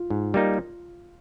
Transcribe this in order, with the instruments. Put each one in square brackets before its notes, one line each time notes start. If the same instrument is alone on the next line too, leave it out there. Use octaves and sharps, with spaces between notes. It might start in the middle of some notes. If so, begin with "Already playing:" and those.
Already playing: [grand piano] F4
[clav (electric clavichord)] G#2
G3 A#3 D#4